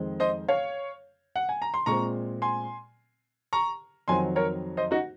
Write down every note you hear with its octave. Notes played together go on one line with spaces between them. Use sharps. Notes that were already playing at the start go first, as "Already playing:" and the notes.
Already playing: F2 D#3 G#3 C4
C5 D#5
C#5 F5
F#5
G#5
A#5
C6
A#2 G#3 C4 A#5 C#6
G#5 C6
A#5 C#6
F2 D#3 F#3 C4 G#5 C6
A#4 C#5
C5 D#5
D#4 F#4